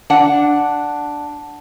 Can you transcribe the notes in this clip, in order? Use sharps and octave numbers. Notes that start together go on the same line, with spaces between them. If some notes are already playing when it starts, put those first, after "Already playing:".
D4 F#5